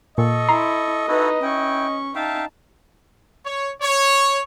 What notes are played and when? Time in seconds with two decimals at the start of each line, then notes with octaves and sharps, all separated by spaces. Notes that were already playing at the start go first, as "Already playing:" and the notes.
0.18 A#2 A4 D#5 C#6
0.49 E4 A#5 C6
1.08 D#4 E4 F#4 A4 B4
1.42 C#4 E4 G5 C#6
2.15 D#4 E5 F5 G5 A5
3.46 C#5
3.82 C#5